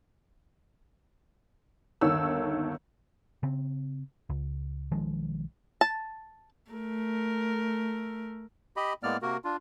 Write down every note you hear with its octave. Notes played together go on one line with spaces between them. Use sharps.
G1 D#2 D#3 A4 C#5 E6
C#3 C4
C#2
B1 D#3 F3 G#3
A5
A3 A#4
G4 D#5 B5
A2 G#3 A#3 B3 D5 F6
C3 A#3 F#4 A#4
D4 F4